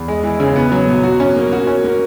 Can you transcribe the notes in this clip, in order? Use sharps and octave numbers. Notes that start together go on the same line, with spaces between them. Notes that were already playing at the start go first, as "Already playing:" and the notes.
Already playing: E2
G#3
E3
C#3
B3
F#3
B2
F#4
C#4
A#3
F#4
C#4
A#3